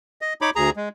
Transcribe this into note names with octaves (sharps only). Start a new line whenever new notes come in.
D#5
D#4 C#5 B5 D6
D2 G#4 A#5
G#3